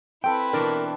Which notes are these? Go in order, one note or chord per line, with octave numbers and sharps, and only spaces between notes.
C4 E4 A4 B4 G5 B5
B2 E3 D4 A#4